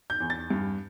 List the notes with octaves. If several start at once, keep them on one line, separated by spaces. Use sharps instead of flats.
G6
E2
A6
G2